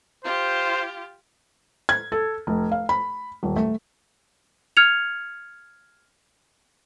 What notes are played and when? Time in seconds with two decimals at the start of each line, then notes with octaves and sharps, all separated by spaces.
0.25 F4 G4 C5
1.89 G#6
2.12 A4
2.47 F1
2.72 F5
2.89 B5
3.43 D#1
3.57 A3
4.77 F6 G#6 C#7 F7